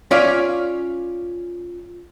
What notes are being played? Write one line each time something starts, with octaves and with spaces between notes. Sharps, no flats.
C#4 F4 C#5 D5 E5 F5